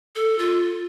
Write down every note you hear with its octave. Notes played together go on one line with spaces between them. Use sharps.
A4
F4